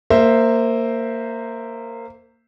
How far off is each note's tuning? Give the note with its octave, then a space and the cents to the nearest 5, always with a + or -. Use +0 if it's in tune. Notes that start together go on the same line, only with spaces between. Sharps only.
A#3 -15 C5 +0 E5 +0